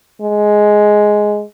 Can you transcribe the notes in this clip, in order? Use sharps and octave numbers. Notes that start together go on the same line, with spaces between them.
G#3